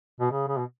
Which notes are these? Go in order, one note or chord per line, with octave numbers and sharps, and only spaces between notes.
B2
C#3
C#3
B2